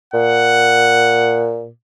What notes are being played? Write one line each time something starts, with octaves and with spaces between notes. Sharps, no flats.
A#2 F#5